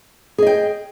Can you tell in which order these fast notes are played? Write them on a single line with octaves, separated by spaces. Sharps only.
G#4 D#5 G5